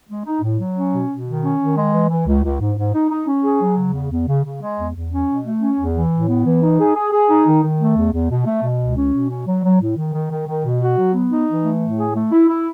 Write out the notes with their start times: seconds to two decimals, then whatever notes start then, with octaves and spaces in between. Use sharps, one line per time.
0.08 G#3
0.25 D#4
0.42 A2
0.59 F#3
0.76 C#4
0.92 B2
1.09 B2
1.26 D#3
1.43 C#4
1.59 D#3
1.76 G#3
1.93 E3
2.09 E3
2.26 C#2
2.43 C#2
2.60 G#2
2.76 G#2
2.93 D#4
3.10 D#4
3.27 C#4
3.44 G#4
3.60 F#3
3.77 C#3
3.93 E2
4.10 E2
4.27 C#3
4.44 C#3
4.61 G#3
4.78 E2
4.95 E2
5.11 C#4
5.28 B2
5.44 A3
5.61 C#4
5.79 E2
5.95 E3
6.12 A2
6.28 B3
6.45 E3
6.62 D#4
6.79 G#4
6.95 G#4
7.12 G#4
7.29 D#4
7.46 D#3
7.62 D#3
7.79 A3
7.96 E2
8.13 E2
8.30 B2
8.46 A3
8.63 B2
8.80 C#2
8.97 C#4
9.13 B2
9.30 C#4
9.47 F#3
9.64 F#3
9.81 A2
9.97 D#3
10.14 D#3
10.31 D#3
10.47 D#3
10.64 B2
10.81 F#4
10.98 F#3
11.14 B3
11.31 D#4
11.48 E3
11.64 A3
11.81 A2
11.98 G#4
12.15 A3
12.31 E4
12.48 E4